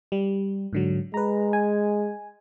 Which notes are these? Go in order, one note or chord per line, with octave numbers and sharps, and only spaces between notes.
G3
G#2 D3 F#3
G#3 B4 A#5
G#5